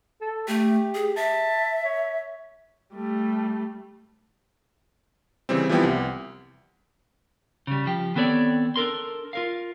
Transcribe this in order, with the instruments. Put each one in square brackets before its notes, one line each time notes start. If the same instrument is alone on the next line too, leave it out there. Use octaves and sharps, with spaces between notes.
[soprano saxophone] A4
[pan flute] A3 [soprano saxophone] G4
[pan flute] G#4
[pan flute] E5 [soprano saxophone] A5
[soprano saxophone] C#5
[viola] G3 A3
[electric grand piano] C#3 E3 G3 C4
E3 F3 G3 B3 E4 G4
C2
[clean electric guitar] C#3 G3
F3 G4
D#3 B3 C4 A4 C#5 D5
D4 A4 A#4 C6
F4 A#4 F5